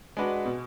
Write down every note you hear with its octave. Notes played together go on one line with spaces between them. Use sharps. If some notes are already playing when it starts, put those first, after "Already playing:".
G#3 D4 F#4 B4
B2